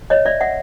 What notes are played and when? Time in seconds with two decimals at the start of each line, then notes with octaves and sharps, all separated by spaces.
0.10 C#5 D#5
0.25 D5 E5
0.41 E5 F#5